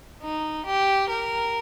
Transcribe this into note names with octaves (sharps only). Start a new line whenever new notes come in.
D#4
G4
A#4